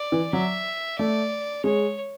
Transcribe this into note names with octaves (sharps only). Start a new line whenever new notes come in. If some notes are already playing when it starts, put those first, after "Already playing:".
Already playing: D5
E3
F#3 E5
A3 D5
G#3 C#5